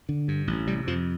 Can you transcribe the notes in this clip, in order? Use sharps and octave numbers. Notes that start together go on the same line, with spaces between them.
D3
G2
A1
C3 G3
F2 F3